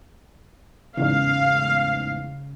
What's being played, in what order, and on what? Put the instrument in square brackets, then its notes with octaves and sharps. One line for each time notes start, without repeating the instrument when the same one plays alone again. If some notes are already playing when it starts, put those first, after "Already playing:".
[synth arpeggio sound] A1 E2 G#2 [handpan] C#3 [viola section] F5